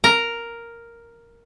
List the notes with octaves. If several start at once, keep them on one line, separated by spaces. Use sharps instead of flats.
A#4